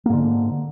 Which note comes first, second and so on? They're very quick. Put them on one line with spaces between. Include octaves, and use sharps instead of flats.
A#3 G#2 D3